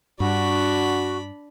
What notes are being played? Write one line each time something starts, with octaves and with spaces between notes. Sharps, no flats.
G2 D4 F#4 B5